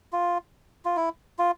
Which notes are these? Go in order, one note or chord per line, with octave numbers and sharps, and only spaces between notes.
F4
F4
E4
F4